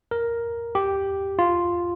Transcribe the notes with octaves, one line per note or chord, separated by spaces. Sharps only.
A#4
G4
F4